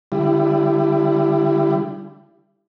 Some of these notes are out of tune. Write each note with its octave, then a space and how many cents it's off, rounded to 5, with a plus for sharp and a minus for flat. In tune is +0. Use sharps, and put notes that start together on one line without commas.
D3 +0 G3 +0 E4 +30